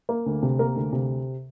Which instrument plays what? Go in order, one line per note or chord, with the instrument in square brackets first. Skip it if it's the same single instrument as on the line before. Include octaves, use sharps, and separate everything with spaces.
[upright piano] A#3
D2
C3
A#3 A#4
D2
C3